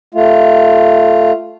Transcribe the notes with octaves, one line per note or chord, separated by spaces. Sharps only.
A3 F4